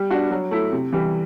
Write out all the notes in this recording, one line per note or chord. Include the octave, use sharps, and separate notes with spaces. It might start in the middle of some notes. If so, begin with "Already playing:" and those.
Already playing: G3
D4 F#4
F#3
A3 E4
C3
E3 G3